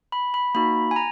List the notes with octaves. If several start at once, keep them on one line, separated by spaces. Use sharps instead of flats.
B5
B5
A#3 D#4 F#4 B5
G#5
A#5